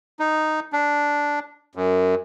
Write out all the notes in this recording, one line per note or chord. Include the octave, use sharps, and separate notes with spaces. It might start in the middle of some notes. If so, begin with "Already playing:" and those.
D#4
D4
F#2